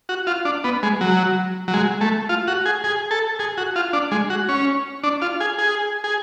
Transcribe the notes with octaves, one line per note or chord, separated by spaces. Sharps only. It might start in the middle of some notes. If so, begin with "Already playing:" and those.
F#4
F4
D4
B3
G#3
F#3
F#3
G#3
A3
F4
F#4
G#4
G#4
A4
G#4
F#4
F4
D4
G#3
F#4
C#4
D4
F4
G#4
G#4
G#4